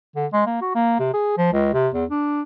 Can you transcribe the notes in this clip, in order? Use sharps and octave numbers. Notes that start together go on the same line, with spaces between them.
D3
G#3
A#3
F#4
A#3
C3
G#4
F3
C#2
C3
E2
D4